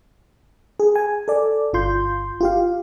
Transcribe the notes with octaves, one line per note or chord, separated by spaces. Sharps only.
G#4
G#5
A4 D5
G1 F4 C6 G6
F4 G4 F5